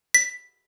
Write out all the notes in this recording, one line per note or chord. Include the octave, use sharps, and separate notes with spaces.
B6